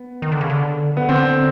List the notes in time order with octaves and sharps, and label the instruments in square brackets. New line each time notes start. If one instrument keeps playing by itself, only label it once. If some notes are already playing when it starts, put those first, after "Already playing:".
Already playing: [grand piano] B3
[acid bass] D#3
D3
C#3
D3
[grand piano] B3
[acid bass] D3 [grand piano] C4